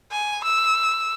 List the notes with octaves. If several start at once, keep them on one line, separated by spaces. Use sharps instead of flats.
G#5
E6